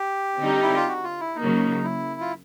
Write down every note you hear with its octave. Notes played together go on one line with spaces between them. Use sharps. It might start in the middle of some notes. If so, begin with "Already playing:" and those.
Already playing: G4
D3 G3 C4 D#4
E4
F4
F#4
F4
E4
C#3 F#3 A#3 D#4
E4
F4